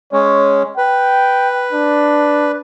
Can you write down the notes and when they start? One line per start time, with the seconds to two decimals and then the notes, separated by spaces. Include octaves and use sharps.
0.12 G#3 C#4 C#5
0.78 B4 G5
1.72 D4